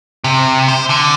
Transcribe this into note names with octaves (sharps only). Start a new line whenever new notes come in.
C3
C5
D3